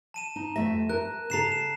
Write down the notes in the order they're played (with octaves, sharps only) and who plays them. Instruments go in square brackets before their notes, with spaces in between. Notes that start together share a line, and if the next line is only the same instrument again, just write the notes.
[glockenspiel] A5 D#7 E7
[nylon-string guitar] D#4
[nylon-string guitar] F2 A3 E5 [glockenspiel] A#6
[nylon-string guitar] A#4 [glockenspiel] F#6
[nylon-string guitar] C#3 A4 [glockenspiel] A#5 C7 E7
[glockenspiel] E7